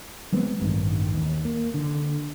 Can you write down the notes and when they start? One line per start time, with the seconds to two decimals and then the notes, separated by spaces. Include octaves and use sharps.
0.32 F#3 G#3 B3 C4
0.60 A1 G2 D#3
1.14 D#2
1.45 A#3
1.74 D3